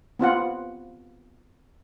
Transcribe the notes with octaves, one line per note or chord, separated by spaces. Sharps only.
B3 C4 F4 F#5